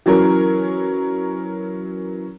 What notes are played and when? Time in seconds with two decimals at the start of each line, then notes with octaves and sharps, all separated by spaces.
0.06 E3 F#3 C#4 A#4